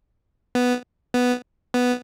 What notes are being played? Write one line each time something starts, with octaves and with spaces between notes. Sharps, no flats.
B3
B3
B3